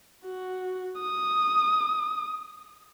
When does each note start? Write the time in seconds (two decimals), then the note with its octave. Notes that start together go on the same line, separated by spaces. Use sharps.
0.24 F#4
1.00 D#6